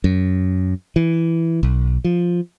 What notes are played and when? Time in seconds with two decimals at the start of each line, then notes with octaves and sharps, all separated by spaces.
0.04 F#2
0.96 E3
1.63 B1
2.04 F3